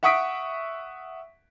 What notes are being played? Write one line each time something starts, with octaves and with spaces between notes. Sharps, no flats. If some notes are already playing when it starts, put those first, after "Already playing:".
E5 F#5 C#6 D#6 B6 D7